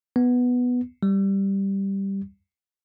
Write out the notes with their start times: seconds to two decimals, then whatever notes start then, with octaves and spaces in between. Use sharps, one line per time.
0.16 B3
1.03 G3